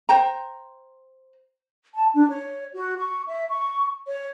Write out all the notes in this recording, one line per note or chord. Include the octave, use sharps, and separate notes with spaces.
C5 G5 A#5
A5
D4
C#5
F#4
C#6
E5
C#6
C#5